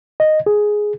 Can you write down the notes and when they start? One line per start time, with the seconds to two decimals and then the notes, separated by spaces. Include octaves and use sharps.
0.20 D#5
0.46 G#4